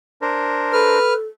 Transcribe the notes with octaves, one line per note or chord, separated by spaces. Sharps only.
D4 A#4 C5
A4 B4 F6